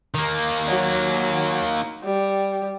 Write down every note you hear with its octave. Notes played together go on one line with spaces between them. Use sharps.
D#3 A#3
F#3
G3